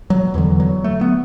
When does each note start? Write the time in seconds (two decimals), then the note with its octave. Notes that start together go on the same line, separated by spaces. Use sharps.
0.10 F#3
0.34 E2 D3 E3
0.60 F#3
0.84 A3
1.01 B3